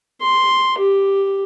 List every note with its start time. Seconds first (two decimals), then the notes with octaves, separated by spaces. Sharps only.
0.21 C6
0.78 G4